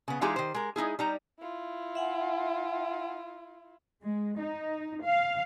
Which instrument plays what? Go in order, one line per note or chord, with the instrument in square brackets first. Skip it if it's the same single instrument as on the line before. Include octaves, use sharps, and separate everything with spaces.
[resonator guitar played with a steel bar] C#3 B3
E3 G#3 D#4 F4 G4 G#4
D#3 C5
G#3 A#4
G#3 D#4 E4 G#4
G3 D#4 A#5
[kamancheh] E4 F4
[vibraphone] E5 F#5 G#5
[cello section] G#3
D#4
F5